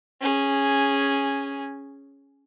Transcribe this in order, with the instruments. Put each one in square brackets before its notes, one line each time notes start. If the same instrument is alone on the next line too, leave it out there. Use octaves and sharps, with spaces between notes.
[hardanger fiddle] C#4 G#4